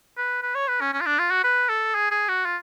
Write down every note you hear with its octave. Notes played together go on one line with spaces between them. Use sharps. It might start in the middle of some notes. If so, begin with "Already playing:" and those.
B4
B4
C#5
B4
C#4
C#4
F4
D4
F4
F#4
B4
A4
G#4
G#4
F#4
F4